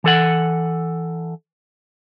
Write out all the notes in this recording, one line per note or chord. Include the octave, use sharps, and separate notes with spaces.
E3 A4 F#5